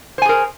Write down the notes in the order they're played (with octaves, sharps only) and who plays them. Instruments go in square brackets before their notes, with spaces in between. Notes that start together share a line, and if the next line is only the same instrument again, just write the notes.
[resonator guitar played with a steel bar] C5
G#5
G#4
A#4